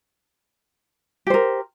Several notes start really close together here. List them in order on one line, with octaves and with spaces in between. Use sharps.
G4 C5 A#4